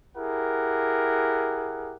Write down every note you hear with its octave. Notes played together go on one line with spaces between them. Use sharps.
E4 G4 G#4 A#4 F#5